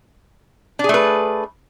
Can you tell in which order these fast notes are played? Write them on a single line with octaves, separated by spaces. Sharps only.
D4 G#4 A3 B4